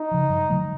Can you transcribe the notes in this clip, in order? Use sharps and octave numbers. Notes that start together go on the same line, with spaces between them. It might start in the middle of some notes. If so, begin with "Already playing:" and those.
Already playing: D#4
C#3 F3
G2
D3 F#3 A3